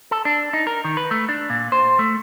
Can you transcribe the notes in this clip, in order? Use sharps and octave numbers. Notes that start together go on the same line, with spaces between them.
A4
D4
D#4
A#4
D#3
B4
A3
D4
A#2
C5
A3